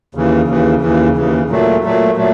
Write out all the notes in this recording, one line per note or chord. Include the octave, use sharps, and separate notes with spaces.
D#2 C#3 E3
D#2 C#3 E3
D#2 C#3 E3
D#2 C#3 E3
A#2 F#3 A3
A#2 F#3 A3
A#2 F#3 A3